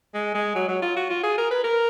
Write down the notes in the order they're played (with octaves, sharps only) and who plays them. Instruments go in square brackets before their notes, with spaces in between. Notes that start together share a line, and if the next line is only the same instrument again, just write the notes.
[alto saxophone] G#3
G#3
F#3
F#3
F4
F#4
F4
G#4
A#4
B4
A#4